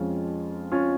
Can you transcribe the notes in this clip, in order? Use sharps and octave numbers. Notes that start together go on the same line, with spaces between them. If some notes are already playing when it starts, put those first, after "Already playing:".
Already playing: F2 F3 G#3 C#4 F4
C#4 F4